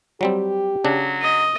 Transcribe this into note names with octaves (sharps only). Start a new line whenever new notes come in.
F#3 G3 C4 G4
C#3 F#3 D4
D#5